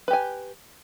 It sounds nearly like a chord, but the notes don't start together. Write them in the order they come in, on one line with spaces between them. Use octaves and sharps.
B4 G4 G#5